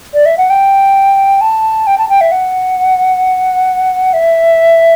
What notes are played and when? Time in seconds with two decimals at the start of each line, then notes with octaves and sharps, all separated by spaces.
0.14 D5
0.26 E5
0.38 F#5
0.50 G5
1.41 A5
1.87 G5
1.98 A5
2.09 G5
2.21 E5
2.32 F#5
4.13 E5